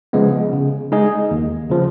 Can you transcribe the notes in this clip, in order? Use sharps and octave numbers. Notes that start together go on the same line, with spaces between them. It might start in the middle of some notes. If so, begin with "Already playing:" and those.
C#3 F3 G#3 B3
C#3
G#3 D#4 G#4 D#5
D#2
C#3 F3